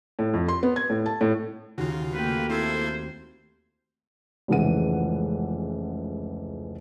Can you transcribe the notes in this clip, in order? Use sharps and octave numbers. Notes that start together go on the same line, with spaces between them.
A2
F2
C6
B3
G#6
A2
A5
A2
D#2 C#3 F4 F#4
A3 A#3 B4 G5
C4 E4 A4 C5 G#6
F1 C#2 C#3 E3 F#5 D#7